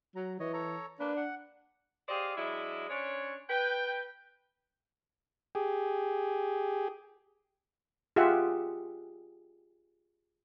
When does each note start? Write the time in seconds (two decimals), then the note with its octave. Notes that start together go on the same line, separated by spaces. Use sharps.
0.16 F#3 A#5
0.40 E3 C#5 D#5
0.53 A4 C#5 A#5
1.00 A#3 D4 B4
1.17 F#5
2.08 G4 G#4 C5 D5 D#5 F5
2.36 F#3 G#3 D4 E4
2.89 C#4 D4 C5 C#5
3.49 B4 G5
5.55 G4 G#4
8.16 F4 G4 G#4 E5 F#5